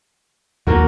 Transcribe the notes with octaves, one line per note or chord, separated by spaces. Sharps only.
D#2 D#3 F3 A#3 F#4